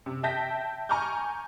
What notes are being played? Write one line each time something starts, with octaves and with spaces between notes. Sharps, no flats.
C3
E5 G5 A5 G6 A#6 B6
G#5 A#5 C#6 D6 F6 G6